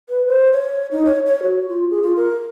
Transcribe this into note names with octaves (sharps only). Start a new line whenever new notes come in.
B4
C5
C#5
D#4
C#5
C#5
F#4
F4
G#4
F4
A#4